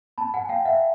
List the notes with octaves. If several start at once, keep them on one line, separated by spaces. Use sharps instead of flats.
A5 B5
F#5 G#5
F5 G5
E5 F#5